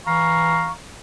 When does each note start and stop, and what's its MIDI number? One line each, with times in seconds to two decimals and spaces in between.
0.06 0.73 52
0.06 0.73 77
0.06 0.73 82
0.06 0.73 85